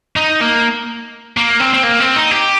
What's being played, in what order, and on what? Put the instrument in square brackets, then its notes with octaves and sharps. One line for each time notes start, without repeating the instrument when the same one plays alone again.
[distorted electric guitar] D#4
A#3
A#3
C4
C4
A#3
C4
D#4
G4